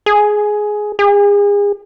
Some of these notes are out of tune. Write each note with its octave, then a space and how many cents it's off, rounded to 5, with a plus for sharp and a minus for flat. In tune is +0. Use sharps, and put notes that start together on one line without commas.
G#4 +10
G#4 -35